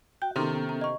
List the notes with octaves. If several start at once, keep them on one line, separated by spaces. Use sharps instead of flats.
F#4 G5 G6
C3 D#3 B3 C#4 A4
A#5
D#5 C#6